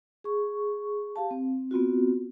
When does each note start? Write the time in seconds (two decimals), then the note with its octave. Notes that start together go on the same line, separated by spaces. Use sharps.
0.24 G#4 C#6
1.16 G4 F5 A5
1.31 C4
1.71 B3 C4 F4 F#4